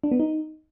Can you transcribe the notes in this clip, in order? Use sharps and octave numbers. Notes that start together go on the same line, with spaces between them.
D4
B3
D#4